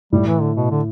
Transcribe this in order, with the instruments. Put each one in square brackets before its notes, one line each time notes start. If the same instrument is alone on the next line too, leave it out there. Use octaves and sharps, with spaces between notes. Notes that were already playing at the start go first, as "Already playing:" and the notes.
[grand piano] A2 [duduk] G3
[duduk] E3
D3
B2
D3